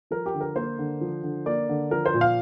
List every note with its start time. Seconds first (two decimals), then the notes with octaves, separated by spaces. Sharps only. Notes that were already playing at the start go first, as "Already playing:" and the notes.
0.11 F3 A#4
0.26 G4
0.34 D3
0.41 A#4
0.56 A#3 C5
0.79 D3
1.01 F3
1.23 D3
1.46 A#3 D5
1.69 D3
1.91 F3 A#4
2.06 C5
2.14 A#2
2.21 F5